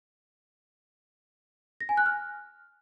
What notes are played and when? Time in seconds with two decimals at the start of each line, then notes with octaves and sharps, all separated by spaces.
1.81 A#6
1.89 G#5
1.97 F#6
2.06 F6